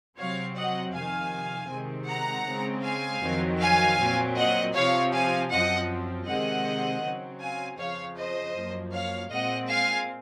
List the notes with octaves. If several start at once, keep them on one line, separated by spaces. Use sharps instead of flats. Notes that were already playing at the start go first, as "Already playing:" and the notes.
C3 F#3 C4 C#5 F5
D#5 F#5
F2 C3 D#3 F5 G#5
C3 D#3 G#3 C4
F#5 A#5
C#3 G#3 C4
F5 G#5
F2 D#3 F#3 C4
F5 G#5
A#2 F#3 C4
D#5 F#5
C3 F3 C4 C#5 F5
F5 G#5
F#2 F3 C4 D#5 F#5
C3 D#3 G#3 C4 D#5 F#5
C#3 F#3 C4
F5 G#5
F2 C#3 F3 C#5 F5
C5 D#5
F#2 F3 A#3
C#5 F5
A#2 G#3 C4 D#5 F#5
F5 G#5